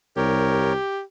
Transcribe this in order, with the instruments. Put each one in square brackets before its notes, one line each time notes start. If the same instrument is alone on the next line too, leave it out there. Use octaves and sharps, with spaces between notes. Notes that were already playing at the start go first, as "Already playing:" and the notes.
[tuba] C2 [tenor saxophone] G4 [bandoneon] A#4 C#5